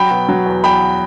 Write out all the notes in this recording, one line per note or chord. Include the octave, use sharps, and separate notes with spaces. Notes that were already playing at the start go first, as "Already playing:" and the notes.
Already playing: F#3 G5 B5
B2
F#3
E2
E2 G5 B5